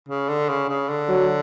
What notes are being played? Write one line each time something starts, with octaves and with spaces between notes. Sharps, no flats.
C#3
D3
C#3
C#3
D3
F#3